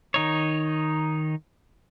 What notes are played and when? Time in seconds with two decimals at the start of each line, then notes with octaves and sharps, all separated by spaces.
0.14 D#3 D#4 C#5